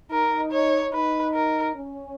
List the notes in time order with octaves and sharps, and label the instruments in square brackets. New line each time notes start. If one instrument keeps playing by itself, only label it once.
[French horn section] D#4 [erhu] A#4
[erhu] C#5
[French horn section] D#4 [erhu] B4
[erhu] A#4
[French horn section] C#4